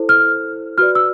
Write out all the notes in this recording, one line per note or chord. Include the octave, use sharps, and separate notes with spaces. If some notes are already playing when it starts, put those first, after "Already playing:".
Already playing: E4 A4 C5
F6
F#4 B4 D5 F6
E6